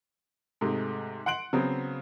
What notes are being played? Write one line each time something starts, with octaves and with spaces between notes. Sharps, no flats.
G#2 C3 G#3 A3
F#5 C6 F#6 D7 F#7
C#3 F#3 B3 C4